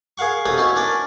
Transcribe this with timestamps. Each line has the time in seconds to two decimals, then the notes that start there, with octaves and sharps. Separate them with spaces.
0.18 G#4 A#4 F5 F#5 C#6
0.46 C2 A3 C#4 B4 A#5 D#6
0.57 F#3 B3 C#4 D#4 E4
0.76 C#4 D4 A#4 B4 D5